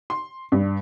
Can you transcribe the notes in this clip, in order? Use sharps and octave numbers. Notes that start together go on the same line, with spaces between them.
C6
G2